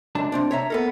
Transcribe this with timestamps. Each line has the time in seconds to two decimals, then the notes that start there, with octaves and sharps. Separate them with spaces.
0.15 C#2 F#2 D4 A5
0.32 C3 C4 D4
0.51 C#5 E5 A#5
0.70 B3 A4 A#4